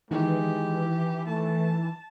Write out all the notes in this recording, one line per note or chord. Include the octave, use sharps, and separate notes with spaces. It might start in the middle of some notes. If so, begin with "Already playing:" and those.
D#3 E3 G#3 G4
A3 A5